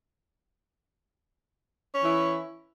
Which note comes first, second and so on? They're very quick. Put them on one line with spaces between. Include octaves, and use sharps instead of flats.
C#4 E3 E4